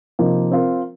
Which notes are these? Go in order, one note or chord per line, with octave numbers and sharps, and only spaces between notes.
C3 F3 A#3 D#4
C4 F4 A#4